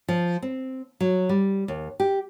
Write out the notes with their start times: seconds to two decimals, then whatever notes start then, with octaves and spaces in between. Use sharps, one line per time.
0.08 F3
0.42 C4
1.00 F#3
1.29 G3
1.68 D#2
2.00 G4